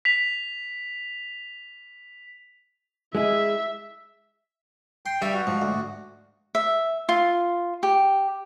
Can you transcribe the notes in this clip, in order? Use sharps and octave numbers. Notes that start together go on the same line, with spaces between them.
B6 F7
G#3 E4 G#4 E5
G5 C6
G2 G3 E5 B5 C#6
F#4
G#2 F3
D2
E5
F4
G4